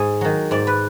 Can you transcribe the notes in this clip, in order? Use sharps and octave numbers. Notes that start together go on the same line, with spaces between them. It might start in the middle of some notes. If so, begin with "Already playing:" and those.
Already playing: G#2 G#4
D#3 F#3
G#2 D5
B4